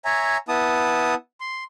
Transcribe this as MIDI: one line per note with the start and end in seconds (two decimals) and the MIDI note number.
0.05 0.37 73
0.05 0.37 76
0.05 0.37 80
0.05 0.37 82
0.49 1.15 59
0.49 1.15 64
0.49 1.15 81
0.49 1.15 87
1.41 1.64 84